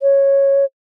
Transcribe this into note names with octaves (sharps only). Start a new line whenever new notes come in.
C#5